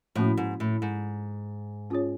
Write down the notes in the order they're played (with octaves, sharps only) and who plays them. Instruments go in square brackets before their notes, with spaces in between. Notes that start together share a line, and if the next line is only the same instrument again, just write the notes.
[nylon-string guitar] A2 [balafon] F3 A#3 C#4 F#4
[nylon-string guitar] G#2
A2
G#2
[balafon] C#4 F4 G#4 C#5